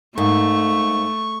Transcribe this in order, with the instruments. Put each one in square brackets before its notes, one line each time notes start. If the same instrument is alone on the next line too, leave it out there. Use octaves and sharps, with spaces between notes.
[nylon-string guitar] G#2 A#3 [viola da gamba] A3 [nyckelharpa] C#6